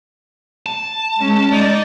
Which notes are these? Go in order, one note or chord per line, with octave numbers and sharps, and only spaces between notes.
A5
G#3 C#4
D#4 D5